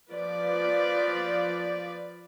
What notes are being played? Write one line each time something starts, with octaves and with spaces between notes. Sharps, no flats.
F3 B4 D5